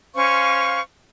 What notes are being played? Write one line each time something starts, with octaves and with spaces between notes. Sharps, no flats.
C#4 C5 F5 C#6